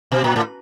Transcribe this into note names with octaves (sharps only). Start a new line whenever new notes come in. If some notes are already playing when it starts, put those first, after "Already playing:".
B2
A#2
A2